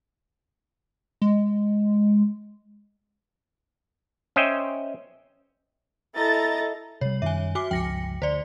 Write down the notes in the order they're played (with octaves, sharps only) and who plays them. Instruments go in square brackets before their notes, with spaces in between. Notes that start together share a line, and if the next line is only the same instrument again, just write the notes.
[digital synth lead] G#3
[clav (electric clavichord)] C#4 C5 D#5 E5 G5
[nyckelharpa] E4 A4 [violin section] D#5 A#5 A6
[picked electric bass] C3 G3 [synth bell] C#5
[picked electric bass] F#2 D#3 G3 [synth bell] E5 G#5
[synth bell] F#4 G#5 D6
[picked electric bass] G1 C#2 F3 [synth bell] G5 A#6 C#7
[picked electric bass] D2 [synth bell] C5 D5